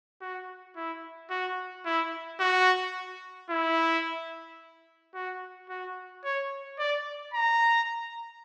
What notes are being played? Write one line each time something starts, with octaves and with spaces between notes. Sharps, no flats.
F#4
E4
F#4
E4
F#4
E4
F#4
F#4
C#5
D5
A#5